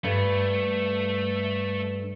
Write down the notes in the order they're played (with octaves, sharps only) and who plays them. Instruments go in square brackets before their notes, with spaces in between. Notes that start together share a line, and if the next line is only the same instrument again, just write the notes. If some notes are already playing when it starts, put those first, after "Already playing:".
[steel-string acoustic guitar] G2 [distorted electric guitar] A3 [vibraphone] A4 B4